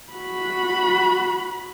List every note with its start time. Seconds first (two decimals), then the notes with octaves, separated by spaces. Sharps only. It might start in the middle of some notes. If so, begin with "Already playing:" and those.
0.13 F#4 B5